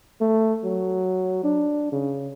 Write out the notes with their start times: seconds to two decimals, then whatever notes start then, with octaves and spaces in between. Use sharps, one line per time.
0.21 A3
0.64 F#3
1.44 D4
1.92 C#3